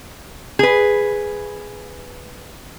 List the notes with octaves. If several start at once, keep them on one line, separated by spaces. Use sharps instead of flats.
G#4 B4